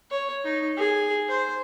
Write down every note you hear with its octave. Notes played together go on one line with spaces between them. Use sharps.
C#5
D#4
G#4
C5